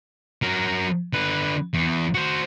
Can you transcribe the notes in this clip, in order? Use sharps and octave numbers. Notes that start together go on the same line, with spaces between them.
F#3 A#4
D3 B4
E2
F#4 C5